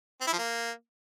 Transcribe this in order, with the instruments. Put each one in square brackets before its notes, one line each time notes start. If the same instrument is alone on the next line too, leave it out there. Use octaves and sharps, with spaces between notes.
[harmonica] C4
E4
F3
A#3